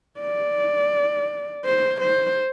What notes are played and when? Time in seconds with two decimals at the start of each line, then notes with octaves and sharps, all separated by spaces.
0.20 D5
1.65 C5
2.01 C5